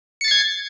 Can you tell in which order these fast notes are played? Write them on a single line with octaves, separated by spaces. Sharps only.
C#7 A6 C7 G#6